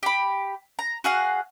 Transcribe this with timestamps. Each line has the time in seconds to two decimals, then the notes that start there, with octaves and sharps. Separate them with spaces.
0.03 G4 B5
0.79 A#5
1.04 F#4 G#4 F5 F#5